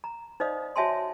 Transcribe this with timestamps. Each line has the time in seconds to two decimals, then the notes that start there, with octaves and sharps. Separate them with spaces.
0.04 A#5
0.40 D#4 C5 D5 D#5 F5 D#6
0.76 F#4 C#5 E5 G#5 A5 C6